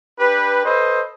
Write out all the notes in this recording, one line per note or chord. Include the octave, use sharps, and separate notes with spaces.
D4 G4 B4
A4 B4 C5 D#5